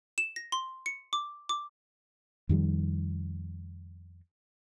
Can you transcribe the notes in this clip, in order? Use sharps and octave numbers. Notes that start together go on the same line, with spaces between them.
E7
A#6
C6
C#7
D6
D6
F2 D#3 G3